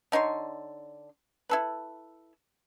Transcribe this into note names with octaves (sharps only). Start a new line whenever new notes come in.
D3 D#4 C#5 C6
E4 A4 B4